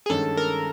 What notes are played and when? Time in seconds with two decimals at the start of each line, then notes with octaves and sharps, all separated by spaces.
0.06 G#4
0.09 G2 D#3 G#3 C#4 A4
0.37 A#4